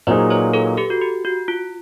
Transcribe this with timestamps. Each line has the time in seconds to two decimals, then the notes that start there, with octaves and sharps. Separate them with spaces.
0.07 A#2 F#3 A#3 D#4 G#4 C5 D5
0.30 B4 C#5
0.53 A4 B4
0.77 G4 A4
0.90 F#4
1.01 G4
1.25 F#4
1.48 F4